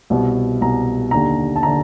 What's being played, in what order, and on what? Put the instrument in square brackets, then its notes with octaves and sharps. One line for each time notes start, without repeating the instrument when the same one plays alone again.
[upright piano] C2 B2
C2 B2 A#5
D#2 D3 A#5
A5
D3 A#5